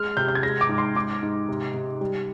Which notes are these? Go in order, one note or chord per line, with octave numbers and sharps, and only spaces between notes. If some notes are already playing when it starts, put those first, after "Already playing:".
Already playing: G#3 F6
C3 G6
G6
G#6
G#3 A#6
D6
G#2
C6
G#2 D6
G#2
C3
C3
G3